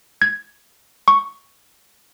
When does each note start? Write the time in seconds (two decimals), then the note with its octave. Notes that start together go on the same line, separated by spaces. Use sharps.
0.22 G#6
1.08 C#6